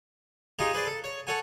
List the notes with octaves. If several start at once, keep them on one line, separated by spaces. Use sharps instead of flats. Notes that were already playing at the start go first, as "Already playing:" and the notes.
D#4 F4 G4 G#4 D#5
G#4 B4 C5 D5
A4
C#5
A4 C#5 F#5 G#5